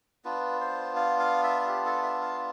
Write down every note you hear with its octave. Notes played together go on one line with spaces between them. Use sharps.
B3 D4 F4 B4
C5
F5
F5
E5
G4
A4
E5
F5